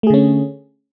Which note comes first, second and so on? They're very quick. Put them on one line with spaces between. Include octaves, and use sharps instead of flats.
A3 G#4 D3 C#4